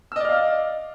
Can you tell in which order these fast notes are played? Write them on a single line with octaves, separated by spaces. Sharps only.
E6 D#5 D5 F6 F5